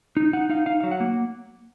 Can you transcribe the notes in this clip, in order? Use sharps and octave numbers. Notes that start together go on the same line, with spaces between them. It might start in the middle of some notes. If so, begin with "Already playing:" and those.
D#4
D#4 F#5
D#4 F5
D#4 F5
F#3 F5
F#5
A#3